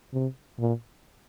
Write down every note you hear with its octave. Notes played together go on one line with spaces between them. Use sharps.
C3
A#2